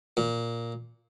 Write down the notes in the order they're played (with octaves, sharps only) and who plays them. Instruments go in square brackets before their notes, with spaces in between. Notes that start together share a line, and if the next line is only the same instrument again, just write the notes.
[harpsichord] A#2